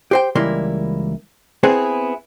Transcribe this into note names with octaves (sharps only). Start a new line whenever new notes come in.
G4 C5 G5
C#2 E3 G3 A#3 E4 C6
B3 C4 E4 G#4 B4 C5